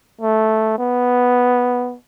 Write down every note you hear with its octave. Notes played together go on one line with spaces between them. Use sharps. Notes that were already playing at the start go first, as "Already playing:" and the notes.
A3
B3